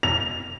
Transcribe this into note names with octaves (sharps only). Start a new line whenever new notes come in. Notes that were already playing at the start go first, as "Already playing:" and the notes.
F7